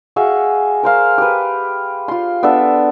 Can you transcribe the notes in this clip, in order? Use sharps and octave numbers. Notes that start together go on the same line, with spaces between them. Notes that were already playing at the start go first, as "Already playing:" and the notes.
F#4 G#4 E5 F5
A#4 C5 F5
G4 B4
F4 C6
B3 D4 A4 E5